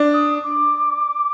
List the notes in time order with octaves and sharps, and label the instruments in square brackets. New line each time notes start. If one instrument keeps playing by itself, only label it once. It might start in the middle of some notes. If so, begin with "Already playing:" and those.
Already playing: [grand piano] D4
[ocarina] D#6
D6